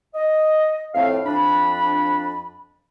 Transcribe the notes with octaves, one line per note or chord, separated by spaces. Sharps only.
D#5
F2 A2 C4 F5
F2 D4 B5